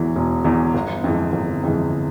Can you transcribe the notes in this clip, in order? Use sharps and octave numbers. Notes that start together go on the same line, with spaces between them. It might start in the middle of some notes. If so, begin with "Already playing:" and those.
Already playing: E1 E2 E3
E1
E2 E3
G1
F2 E3 G#3
G1
F2 E3 G#3